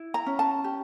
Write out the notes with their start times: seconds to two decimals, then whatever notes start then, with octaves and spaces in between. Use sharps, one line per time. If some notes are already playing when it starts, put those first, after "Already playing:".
Already playing: E4
0.14 A#5
0.26 C#4
0.39 A5
0.64 G4